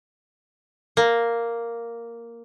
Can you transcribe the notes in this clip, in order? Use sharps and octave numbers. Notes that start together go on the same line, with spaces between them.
A#3